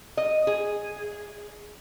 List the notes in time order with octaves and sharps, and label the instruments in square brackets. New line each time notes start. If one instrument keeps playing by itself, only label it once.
[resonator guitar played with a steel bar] D#5
G#4